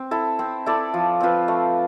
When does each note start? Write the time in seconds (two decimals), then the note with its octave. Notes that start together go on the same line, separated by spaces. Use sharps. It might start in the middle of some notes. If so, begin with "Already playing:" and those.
Already playing: C4
0.11 E4 A4
0.39 C4
0.66 E4 A4 D5
0.94 F3
1.20 C4 F4 B4
1.48 A3